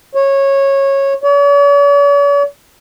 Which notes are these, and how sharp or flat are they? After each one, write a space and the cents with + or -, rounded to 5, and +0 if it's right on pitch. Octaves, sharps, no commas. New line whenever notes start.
C#5 -15
C#5 +45